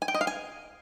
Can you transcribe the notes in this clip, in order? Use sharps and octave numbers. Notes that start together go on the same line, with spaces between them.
G#5
G5
D#5
F5
G#5